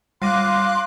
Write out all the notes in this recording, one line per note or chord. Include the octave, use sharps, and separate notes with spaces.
G3 F5 C6 D6 F#6 A#6 D#7